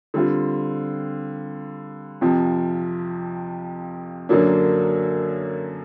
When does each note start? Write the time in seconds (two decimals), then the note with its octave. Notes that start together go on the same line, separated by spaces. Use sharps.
0.14 D3 G3 C4 F4
2.21 F2 C3 F3
4.29 F#2 D3 F#3 A#3 D4